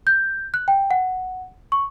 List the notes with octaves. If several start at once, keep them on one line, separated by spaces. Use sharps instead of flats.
G6
F#6
G5
F#5
C#6